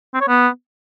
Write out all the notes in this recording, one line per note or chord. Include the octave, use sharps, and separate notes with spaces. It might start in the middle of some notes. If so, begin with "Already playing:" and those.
C4
C#5
B3